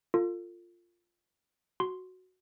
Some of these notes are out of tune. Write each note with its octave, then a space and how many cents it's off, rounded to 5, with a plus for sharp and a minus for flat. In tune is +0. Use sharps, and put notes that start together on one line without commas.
F4 +0 A4 +35
F#4 +0 C6 +0